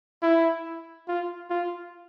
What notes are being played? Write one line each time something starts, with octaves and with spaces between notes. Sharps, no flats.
E4
F4
F4